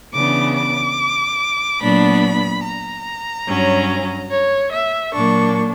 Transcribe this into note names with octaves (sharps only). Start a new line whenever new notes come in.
C#3 E3 B3 D4 D6
D6
A#2 F#3 B3 D4 B5
A#5
G2 F#3 C#4
C#5
E5
A#2 F#3 A#3 D4 C#6